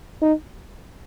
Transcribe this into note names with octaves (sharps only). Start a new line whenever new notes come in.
D#4